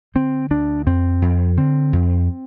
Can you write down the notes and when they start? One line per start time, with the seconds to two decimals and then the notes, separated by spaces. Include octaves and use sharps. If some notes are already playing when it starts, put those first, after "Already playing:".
0.15 D3 C4
0.51 D2 D4
0.86 F2 C4
1.22 F2
1.57 D3 C4
1.93 F2